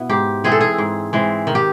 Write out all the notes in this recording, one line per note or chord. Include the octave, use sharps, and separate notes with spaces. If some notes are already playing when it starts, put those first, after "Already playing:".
Already playing: B2 B3 E4
G#2 G4
E3 G#3 C4 G#4
A4
G#4
G#2
E3 G#3 C4
D#3
G4